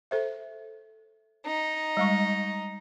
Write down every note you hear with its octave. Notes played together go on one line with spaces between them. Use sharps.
A4 C5 E5
D#4
G3 G#3 C#6